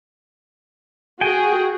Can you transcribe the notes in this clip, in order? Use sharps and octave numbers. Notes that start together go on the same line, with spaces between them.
F#4 G#4 G5 G#5